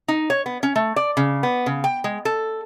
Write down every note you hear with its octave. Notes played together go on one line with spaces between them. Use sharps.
D#4
C#5
B3
C#4
A3
D5
C#3
B3
C#3
G5
G#3
A4